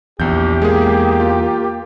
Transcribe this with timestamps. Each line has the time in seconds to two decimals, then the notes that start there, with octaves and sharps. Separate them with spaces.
0.20 A#1 E2 G4 G6
0.62 G#3 A#3 G#4
1.20 F4